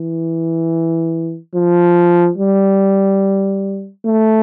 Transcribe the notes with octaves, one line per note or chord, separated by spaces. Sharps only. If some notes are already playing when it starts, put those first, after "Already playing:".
Already playing: E3
F3
G3
A3